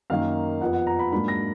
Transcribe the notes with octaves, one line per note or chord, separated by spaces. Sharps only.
F#2 D#3 A#3 F5
F2 F3 B3 F#5
F#5
A#5
B5
G#2 F#3 A#3 D4 B5
A#6